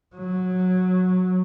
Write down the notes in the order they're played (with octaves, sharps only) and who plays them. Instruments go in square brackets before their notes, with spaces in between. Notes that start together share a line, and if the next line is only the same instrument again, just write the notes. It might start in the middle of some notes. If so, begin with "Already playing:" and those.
[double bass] F#3